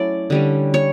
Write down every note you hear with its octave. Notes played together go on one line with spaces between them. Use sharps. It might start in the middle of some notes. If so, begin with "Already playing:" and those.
Already playing: F#3 A3 C#4 E4 D5
D3 G3 C#4
C#5